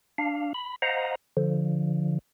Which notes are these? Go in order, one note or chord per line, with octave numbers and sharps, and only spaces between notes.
D4 F5
B5
C5 D#5 F5 F#5 A#5
D3 F3